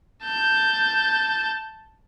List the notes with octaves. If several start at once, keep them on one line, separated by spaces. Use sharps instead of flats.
A5 G6